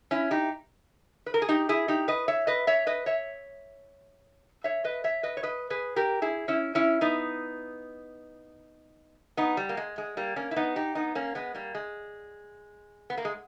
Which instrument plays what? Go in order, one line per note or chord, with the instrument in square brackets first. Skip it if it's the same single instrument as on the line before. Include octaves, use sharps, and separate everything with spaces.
[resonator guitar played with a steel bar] C#4 E4
D#4 G4
B4
A#4
G#4
D#4 G4
E4 G#4
D#4 G4
B4 D#5
C#5 E5
B4 D#5
C#5 E5
B4 D#5
C#5 E5
C#5 E5
B4 D#5
C#5 E5
B4 D#5
C#5
B4 D#5
G#4 B4
G4 A#4
E4 G#4
C#4 E4
C#4 E4
B3 D#4
B3 D#4
G3
A#3
G#3
G#3
G3 A#3
A#3 C#4
E4
B3 D#4
D#4 G4
B3 D#4
A#3 C#4
G#3 B3
G3 A#3
G#3
B3
A#3
G#3